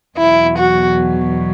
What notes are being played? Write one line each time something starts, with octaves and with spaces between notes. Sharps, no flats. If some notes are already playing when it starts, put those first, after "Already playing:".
E2 B2 F#3 E4
F#4